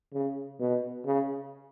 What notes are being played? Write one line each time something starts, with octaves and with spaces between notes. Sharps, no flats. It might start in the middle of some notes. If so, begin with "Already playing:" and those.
C#3
B2
C#3